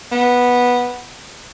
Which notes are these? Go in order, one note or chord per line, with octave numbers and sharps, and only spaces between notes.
B3